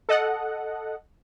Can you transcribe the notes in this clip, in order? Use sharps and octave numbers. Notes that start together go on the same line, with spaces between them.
A4 D#5 F#5